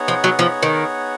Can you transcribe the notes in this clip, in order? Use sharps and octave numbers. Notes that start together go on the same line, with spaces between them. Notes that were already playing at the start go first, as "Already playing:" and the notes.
Already playing: B3 D#4 G#4 C#5 F#5
F3
F#3
F3
D#3